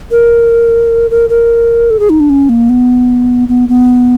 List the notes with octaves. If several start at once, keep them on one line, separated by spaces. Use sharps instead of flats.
A#4
A#4
A#4
A4
G#4
D#4
D4
C#4
A#3
B3
B3
B3